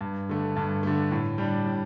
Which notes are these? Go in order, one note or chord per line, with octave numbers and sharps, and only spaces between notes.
G2
D3 A3
G2
D3 A3
A2
G3 D4
A2